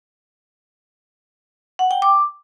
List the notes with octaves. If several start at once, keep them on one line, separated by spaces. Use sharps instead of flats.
F#5
G5
D6